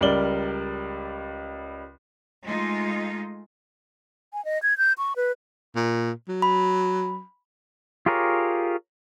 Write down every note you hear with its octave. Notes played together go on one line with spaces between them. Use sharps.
C#2 G3 A#4 D5 F#7 G7
G#3 A3 D#4 F4
G#5
D#5
G#6
G6
C#6
B4
A#2
F#3
B5
F4 G4 G#4 A#4 C#5